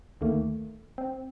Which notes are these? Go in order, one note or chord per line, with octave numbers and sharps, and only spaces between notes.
D2 D#3 A3 A#3
C4